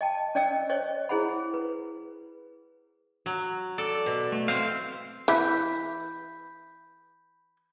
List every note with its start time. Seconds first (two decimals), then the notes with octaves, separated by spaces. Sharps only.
0.01 D#5 G5 A5
0.35 C#4 D5 D#5 G5 E6
0.69 C5 C#5 D#5
1.09 E4 G#4 C5 F#5 B5
1.54 B4
3.26 F#3
3.78 A4 D5
4.06 B2
4.32 A3
4.48 C4 E4 C5 F5
5.28 E3 B5 G6 B6